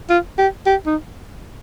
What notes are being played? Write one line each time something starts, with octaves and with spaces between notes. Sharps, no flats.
F4
G4
G4
D#4